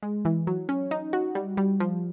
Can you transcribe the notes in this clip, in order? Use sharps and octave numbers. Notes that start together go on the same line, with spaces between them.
G#3
E3
F#3
C#4
D#4
F#4
G3
G3
F3